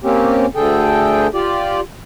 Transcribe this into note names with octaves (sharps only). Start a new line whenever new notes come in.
A#3 C4 C#4 G4
D2 D3 G#4 A4 G5
F4 G4 D5